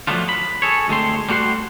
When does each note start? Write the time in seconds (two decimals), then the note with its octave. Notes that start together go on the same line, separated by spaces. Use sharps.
0.07 F3 F#3 A3 B3 D4 F4
0.29 B5
0.62 G#4 A4 C#5
0.88 D2 G#3 A3 C4 C6
1.29 G3 A3 F#4 F#5 C6